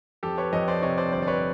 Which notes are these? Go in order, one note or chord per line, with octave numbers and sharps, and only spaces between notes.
F2 G4 A4
B4 C#5
F2 C#5 D#5
C5 D5
C3 C#5 D#5
C5 D5
G1 C5 D5
D5
B4 C#5